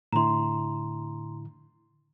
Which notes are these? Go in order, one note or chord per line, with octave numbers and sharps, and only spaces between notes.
A2 D3 E4 A#5 C6